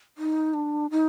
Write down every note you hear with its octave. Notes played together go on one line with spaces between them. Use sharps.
D#4
D4
D#4